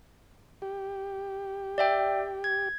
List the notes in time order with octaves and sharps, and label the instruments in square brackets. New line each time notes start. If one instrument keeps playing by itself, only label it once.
[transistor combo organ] G4
[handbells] D5 E5 G5
G#6